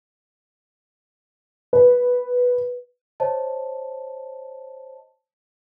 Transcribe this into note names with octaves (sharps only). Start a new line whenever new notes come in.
B4
C5 C#5 D#5 A5